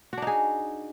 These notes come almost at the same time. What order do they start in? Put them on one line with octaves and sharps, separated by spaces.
F#4 D4 D#4 G#4